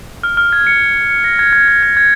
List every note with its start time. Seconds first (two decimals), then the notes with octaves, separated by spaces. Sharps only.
0.23 F6
0.37 F6
0.52 G#6
0.67 C#7
1.10 C#7
1.24 A#6
1.39 G#6
1.53 G#6
1.68 G#6
1.83 G#6
1.97 G#6